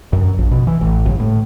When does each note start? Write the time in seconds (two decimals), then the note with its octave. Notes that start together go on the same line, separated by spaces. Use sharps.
0.13 F#2
0.38 A#1
0.51 B2
0.67 E3
0.81 A1
1.06 G1
1.20 A2